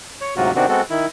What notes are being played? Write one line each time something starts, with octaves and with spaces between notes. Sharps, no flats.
C#5
D2 G#2 C3 F#3 F4 F#4
C3 D#3 B3 C4 D4 F#4
G#3 B3 C4 F#4 A4
D#3 E4